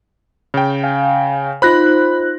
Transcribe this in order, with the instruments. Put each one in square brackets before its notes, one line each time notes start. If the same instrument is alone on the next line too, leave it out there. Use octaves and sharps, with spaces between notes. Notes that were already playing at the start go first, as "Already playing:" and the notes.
[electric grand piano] C#3 G5
[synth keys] F5 G#5
[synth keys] D#4 F4 C5 [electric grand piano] B5 F#6 A#6